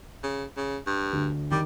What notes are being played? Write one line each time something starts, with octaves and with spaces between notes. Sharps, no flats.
C#3
C#3
G2
D2
D#3 G3 D6